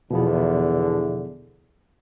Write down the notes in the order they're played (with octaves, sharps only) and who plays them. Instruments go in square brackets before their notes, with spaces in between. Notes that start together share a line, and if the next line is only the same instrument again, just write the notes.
[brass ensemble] E2 D3 [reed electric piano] B2 F3 B3